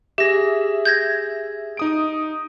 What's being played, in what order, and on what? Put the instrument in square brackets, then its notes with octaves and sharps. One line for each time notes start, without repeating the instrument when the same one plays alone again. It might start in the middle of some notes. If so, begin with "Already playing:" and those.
[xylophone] G4 A#6 [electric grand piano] G#4 E5
[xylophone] G6 G#6 A#6
[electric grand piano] D#4 D#6 D7